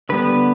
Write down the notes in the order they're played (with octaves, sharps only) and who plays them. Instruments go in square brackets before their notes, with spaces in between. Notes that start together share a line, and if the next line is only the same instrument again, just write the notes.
[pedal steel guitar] D3 G3 B3 B4